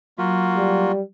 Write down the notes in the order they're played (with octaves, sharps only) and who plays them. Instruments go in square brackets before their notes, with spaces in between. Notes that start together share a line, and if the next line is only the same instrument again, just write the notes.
[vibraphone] F#3 [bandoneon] A#3 F4 F#4
[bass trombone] G3